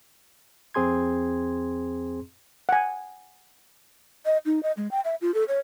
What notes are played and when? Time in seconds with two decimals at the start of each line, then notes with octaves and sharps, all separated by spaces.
0.74 F2 C4 G#4 C6 G#6
2.69 F#5 G#5
4.26 D#5
4.46 D#4
4.63 D#5
4.77 G#3
4.91 G5
5.05 E5
5.21 F4
5.34 A4
5.48 C#5